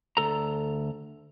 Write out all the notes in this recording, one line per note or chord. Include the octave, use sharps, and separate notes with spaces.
D2 A4 A#5